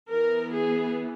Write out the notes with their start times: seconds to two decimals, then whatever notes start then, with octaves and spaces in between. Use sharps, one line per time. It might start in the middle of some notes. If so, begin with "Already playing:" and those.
0.10 E3 B3 A#4
0.55 G#4